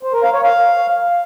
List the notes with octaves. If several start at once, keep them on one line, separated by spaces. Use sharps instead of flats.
C5
A#4
F5
C#5
F5